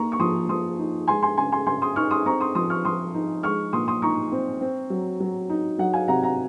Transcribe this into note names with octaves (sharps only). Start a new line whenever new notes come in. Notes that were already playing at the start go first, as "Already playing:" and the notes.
Already playing: A#3 D#4 A#5 C#6
C#6
F3 C6 D#6
F3 C6 D#6
D#4
G#3 G#5 C6
G#5 C6
C#3 G#5 C6
G#5 C6
C#3 G#5 C6
C6 D#6
D#4 C#6 F6
C6 D#6
C4 A#5 C#6
C6 D#6
F3 C6 D#6
C#6 F6
F3 C6 D#6
D#4
G#3 C#6 F6
A#2 C6 D#6
C6 D#6
D#4 A#5 C#6
C4
C4
F#3
F#3
D#4
F#3 F#5
F5 G#5
C3 F#5 A#5
F#5 A#5